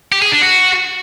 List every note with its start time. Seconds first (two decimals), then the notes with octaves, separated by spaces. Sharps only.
0.12 G4
0.22 G#4
0.32 D4
0.41 F#4